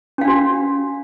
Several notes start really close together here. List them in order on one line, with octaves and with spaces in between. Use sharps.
C#4 F5 D4 F#4